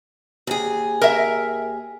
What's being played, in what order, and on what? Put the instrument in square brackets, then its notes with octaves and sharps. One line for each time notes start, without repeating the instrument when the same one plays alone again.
[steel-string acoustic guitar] D#2 G#4
[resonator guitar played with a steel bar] A#4 E5